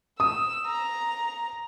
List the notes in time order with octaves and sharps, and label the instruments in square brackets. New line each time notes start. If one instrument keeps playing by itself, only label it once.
[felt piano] D#6 [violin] E6
[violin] A#5